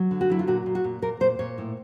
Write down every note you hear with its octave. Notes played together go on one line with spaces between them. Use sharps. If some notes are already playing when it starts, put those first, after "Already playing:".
Already playing: F#3
D3
F#4
F#3 E4
F4
A#2 F#4
A#2
F#4
A#2
A#2 A#4
A#2 C5
A#2 C#5
A2